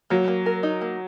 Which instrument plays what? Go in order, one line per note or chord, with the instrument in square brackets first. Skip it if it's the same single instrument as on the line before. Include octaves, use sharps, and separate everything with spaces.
[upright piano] F#3 [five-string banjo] A#3
[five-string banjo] A#3
A#4
D#4
A#3